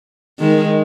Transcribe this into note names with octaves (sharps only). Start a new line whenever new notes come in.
D#3 G#3